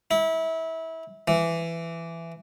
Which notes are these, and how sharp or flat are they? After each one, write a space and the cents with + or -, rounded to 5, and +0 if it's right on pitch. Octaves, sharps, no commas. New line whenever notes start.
E4 -25
E3 +15